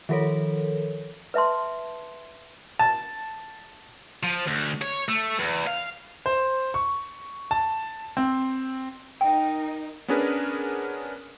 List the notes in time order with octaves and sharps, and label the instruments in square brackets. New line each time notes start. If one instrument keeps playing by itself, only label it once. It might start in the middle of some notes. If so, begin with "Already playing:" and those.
[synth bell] D#3 F3 A4 A#4 C#5
[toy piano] B4 E5 A5 C6
[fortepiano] A5
[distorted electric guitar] F3
D2
C#5
A3
E2
F5
[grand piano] C5
C#6
A5
C4
[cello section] D#4 A#4 [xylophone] G5
[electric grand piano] B3 C#4 D4 G#4 A#4 B4